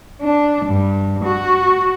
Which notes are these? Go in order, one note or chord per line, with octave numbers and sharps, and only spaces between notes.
D4
G2
F#4